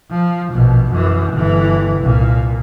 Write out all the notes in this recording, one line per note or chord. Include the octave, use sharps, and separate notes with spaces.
F3
A#1 B2
F#2 E3
G1 E3
C2 A#2